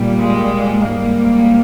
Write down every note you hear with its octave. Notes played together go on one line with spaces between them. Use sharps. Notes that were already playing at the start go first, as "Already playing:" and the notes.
Already playing: A#2 G3
G#3
G#2 G3 A#3